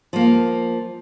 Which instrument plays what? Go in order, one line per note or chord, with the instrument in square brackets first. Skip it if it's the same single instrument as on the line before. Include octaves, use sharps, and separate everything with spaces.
[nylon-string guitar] F3 A#3